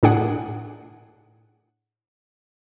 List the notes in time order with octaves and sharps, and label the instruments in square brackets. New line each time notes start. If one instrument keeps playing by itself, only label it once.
[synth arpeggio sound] A2 D4 G#4 F#5